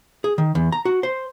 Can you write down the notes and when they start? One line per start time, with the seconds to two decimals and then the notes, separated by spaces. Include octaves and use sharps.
0.24 G#4
0.38 D#3
0.55 E2
0.72 A#5
0.85 F#4
1.03 C5